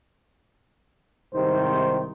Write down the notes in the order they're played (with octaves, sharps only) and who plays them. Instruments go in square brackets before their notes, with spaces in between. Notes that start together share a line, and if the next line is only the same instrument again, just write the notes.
[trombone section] C2 G#2 C3 D#3 C5